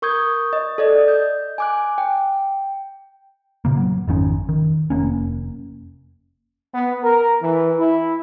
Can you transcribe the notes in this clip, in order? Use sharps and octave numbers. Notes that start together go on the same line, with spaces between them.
A#4 C#6 D#6 G6 G#6
D#5
A4 D5 D#5
G6
G#5 D6 F#6
G5
A#2 C#3 A#3
F#3
G#1 F2 D#3 C#4
D#3
F1 A#3 C#4
B3
A#4
E3
E4